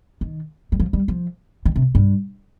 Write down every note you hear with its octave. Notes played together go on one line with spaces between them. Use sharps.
D#3
G3
F3
G3
F3
D#3
C3
G2